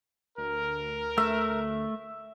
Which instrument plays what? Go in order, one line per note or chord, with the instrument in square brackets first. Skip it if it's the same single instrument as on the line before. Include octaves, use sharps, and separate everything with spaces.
[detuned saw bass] D2 [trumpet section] A#4
[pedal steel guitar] A3 [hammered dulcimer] E5